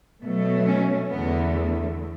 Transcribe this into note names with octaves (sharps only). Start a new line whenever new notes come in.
B2 F#3 A3
C#4
E2 D3 A3 B3